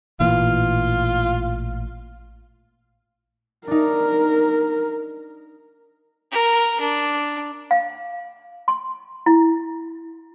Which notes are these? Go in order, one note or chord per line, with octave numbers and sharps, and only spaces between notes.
A1 A#2 E3 F4
D4 D#4 A#4
A#4
D4
F5
C6
E4